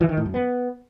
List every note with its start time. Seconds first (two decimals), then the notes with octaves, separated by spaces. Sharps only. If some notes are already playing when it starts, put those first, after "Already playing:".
0.01 E3
0.09 D#3
0.17 A2
0.26 F#2
0.34 B3